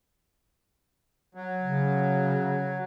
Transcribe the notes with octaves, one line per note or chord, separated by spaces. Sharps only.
F#3
C#3